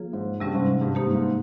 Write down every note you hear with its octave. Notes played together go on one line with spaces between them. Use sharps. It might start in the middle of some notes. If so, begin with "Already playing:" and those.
Already playing: F3 A#3 F4 G#4 C#5
G#2
G2 C3 G3 C#4
G#2
G#2
G2
G#2 A#3 D#4 G4
G#2